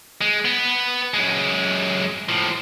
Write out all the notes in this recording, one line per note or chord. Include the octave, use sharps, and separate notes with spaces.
G#3
B3
F#2 G#3
A2 F3